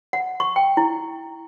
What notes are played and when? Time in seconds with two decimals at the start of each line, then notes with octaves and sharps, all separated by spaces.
0.13 F#5
0.40 C#6
0.56 G5
0.77 E4